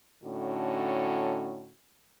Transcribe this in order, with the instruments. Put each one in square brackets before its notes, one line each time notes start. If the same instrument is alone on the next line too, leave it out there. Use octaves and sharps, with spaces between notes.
[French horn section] A2 D3 C#4 D#4 F#4